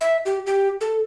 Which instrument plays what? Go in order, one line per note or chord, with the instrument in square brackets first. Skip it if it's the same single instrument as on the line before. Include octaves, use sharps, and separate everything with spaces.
[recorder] E5
G4
G4
A4